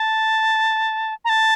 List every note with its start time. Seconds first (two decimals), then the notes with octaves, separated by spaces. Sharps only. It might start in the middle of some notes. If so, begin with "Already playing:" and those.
Already playing: A5
1.25 A#5
1.29 A5